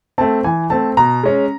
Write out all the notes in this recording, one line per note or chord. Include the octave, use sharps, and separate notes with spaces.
A3 C4 A5
E3 G#5
A3 C4 A5
B2 A#5
G#3 C#4